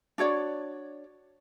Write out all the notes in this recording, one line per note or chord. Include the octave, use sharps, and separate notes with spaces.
D4 F#4 C#5 D5